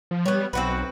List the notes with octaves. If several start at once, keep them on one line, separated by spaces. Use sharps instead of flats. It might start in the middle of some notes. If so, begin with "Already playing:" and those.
F3
G3 B3 C#5
B1 C4 F#4 B4